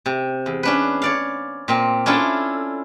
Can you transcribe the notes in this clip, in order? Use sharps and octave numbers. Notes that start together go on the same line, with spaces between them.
C3
E2
C#4 D4 B4
C#5 D5 F5
A#2 C4 F5
C#4 D4 E4 F4 A4